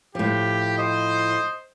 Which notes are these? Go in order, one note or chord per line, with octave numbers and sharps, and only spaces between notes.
A2 F3 G4
C5 D#5